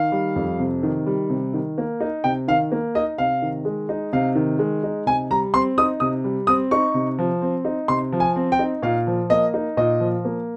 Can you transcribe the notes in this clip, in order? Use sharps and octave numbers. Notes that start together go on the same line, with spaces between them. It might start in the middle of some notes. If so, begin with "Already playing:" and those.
Already playing: D#3 F5
G3
F2
C3
D#3
G3
C3
D#3
A#3
D#4
C3 G5
D#3 F5
A#3
D#4 D#5
C3 F5
D#3
G#3
D#4
C3 F5
D#3
G#3
D#4
C3 G#5
G3 A#5
C4 C6
D#4 D#6
C3 D#6
G3
C4 D#6
D#4 C#6
C3
F3
C4
D#4
C3 C6
F3
G#5
C4
G5
D#4
A#2 F5
F3
A#3 D#5
D#4
A#2 D#5
F3
A#3